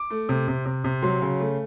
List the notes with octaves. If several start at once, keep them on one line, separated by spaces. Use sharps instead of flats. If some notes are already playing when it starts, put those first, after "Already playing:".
Already playing: D6
A3
C3
C3
C3
C3
F#3 C6
C#3
A3